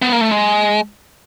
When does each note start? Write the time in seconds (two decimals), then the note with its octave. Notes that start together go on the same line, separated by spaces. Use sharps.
0.02 B3
0.12 A#3
0.21 A3
0.31 G#3